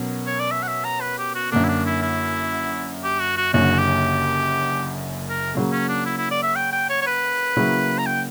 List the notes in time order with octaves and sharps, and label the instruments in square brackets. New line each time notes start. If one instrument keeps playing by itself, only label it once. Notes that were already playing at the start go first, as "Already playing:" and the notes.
Already playing: [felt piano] B2 F#3 C#4 A#4
[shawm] C#5
D5
E5
F#5
E5
A#5
B4
G4
F#4
[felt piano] F#2 D3 A#3 [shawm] D4
[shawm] E4
D4
E4
E4
G4
F#4
F#4
[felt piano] F#1 F#2 D3 A#3 C#4 [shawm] F#4
[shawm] G4
A#4
[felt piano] C#3 F#3 A#3
[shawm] C#4
D4
E4
E4
D5
E5
G5
G5
C#5
C#5
B4
[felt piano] C#3 F#3 A#3 E4
[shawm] A#5
G5